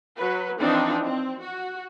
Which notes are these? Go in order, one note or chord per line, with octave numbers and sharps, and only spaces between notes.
F#3 B4
E3 F3 C4 D4 D#4
C4
F#4